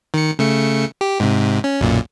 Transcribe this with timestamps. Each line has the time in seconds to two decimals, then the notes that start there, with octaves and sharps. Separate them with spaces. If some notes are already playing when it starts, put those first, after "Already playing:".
0.14 D#3 C#7
0.39 C#3 A3 C#7
1.01 G4
1.20 G#2 C3
1.64 C#4
1.81 B1 F#2 A#2